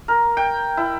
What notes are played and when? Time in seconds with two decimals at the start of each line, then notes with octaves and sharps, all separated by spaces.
0.08 A#4
0.37 G5
0.77 E4